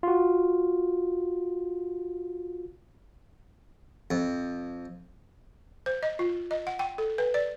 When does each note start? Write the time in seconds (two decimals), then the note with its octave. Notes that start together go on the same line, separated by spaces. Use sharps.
0.03 F4 F#4
4.11 F2
5.86 C5
6.03 D#5
6.19 F4
6.51 D#5
6.67 F#5
6.79 G5
6.98 A4
7.18 B4
7.34 D5